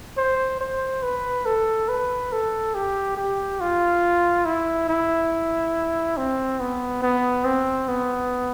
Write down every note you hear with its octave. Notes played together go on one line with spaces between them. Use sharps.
C5
C5
B4
A4
B4
A4
G4
G4
F4
E4
E4
C4
B3
B3
C4
B3